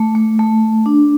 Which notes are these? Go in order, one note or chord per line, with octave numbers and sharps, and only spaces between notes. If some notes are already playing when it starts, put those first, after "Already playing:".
Already playing: A3
A3
A3
D4